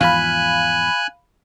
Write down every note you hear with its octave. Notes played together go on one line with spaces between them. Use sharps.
E2 G#2 F3 F5 G#5 B5 F#6